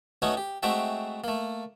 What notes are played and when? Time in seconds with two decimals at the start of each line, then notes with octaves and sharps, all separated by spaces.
0.22 A3 B3 C#4 D#4 F#4 C#5
0.37 G4
0.63 G#3 A3 C4 F#4 E5 G5
1.24 A3 A#3